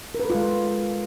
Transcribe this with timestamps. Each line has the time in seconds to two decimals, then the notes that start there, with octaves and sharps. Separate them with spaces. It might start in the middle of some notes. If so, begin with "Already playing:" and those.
0.15 A#4
0.20 B4
0.25 A4
0.30 F4
0.35 G#3